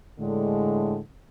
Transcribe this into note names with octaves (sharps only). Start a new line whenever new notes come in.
A2 D3 G#3